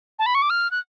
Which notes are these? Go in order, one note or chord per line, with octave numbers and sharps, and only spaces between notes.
A5
B5
C#6
D6
F6
F#6